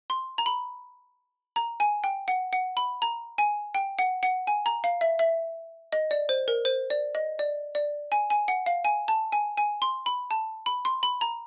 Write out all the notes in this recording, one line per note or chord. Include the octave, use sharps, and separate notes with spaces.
C6
A#5
B5
A#5
G#5
G5
F#5
F#5
B5
A#5
G#5
G5
F#5
F#5
G#5
A#5
F5
E5
E5
D#5
D5
C5
A#4
C5
D5
D#5
D5
D5
G#5
G#5
F#5
F5
G#5
A5
G#5
G#5
C6
B5
A5
B5
C6
B5
A#5